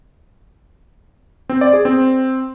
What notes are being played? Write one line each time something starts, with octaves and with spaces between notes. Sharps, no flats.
C4
D5
G#4
C4